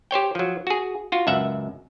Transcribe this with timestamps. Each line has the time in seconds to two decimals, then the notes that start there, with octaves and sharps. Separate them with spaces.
0.11 G4 C5 C#5 G5
0.35 F3 F#3
0.67 F#4 G#4
1.12 F4 F#4
1.27 C#2 F#2 E5 F#5